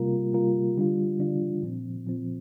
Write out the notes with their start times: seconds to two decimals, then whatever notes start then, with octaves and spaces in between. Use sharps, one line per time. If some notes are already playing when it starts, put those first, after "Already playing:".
Already playing: C3 G3 A#3 F4 A#4
0.33 C3 G3 A#3 F4 A#4
0.76 D3 G3 D4 F4
1.19 D3 G3 D4 F4
1.63 A#2 F3 C4
2.06 A#2 F3 C4